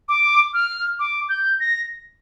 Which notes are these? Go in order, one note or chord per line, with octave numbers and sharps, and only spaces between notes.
D6
F6
D6
G6
A#6